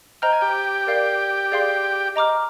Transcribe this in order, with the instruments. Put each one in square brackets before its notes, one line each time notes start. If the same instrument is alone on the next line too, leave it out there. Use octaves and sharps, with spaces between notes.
[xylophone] C5 D#5 A#5 F6 [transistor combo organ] G5
[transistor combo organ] G#5
G4 G5
[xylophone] A#4 D5 F5
G#4 D5 F5 C6
D#5 A#5 D6 F6